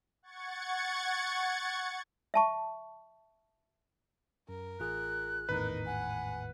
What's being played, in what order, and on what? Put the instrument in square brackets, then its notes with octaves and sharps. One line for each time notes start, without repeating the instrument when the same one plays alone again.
[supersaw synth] F#5 C#6 G#6 A6 C#7
[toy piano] E5 A5 C#6
[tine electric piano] F#2 [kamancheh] A#4
[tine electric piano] A1 F4 G#4 [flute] F#6
[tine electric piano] G#1 E2 A2 [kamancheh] D#4 A#4 [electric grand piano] B4
[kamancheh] F#5 [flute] G#5